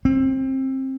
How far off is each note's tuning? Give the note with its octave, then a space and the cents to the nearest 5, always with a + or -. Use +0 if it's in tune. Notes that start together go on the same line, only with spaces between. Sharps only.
C4 +25